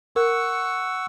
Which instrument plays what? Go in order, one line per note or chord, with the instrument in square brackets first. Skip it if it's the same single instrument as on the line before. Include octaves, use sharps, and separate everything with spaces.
[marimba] A#4 [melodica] F#5 C#6 E6